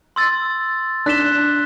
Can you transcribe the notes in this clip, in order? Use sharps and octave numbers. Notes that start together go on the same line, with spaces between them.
C6 E6 A6
D4 F#6 B6 E7 G7